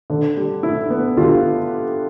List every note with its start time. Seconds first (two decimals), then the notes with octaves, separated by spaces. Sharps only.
0.10 D3
0.37 G3
0.63 E4
0.90 B3
1.17 D3 F4 G4